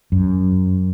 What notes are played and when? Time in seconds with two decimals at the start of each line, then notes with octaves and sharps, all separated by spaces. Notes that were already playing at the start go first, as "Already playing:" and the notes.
0.12 F#2